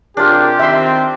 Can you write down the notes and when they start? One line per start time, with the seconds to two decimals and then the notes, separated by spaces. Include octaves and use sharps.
0.17 C3 D4 F4 G4 G#4 A#4
0.59 D#3 C4 E5 C6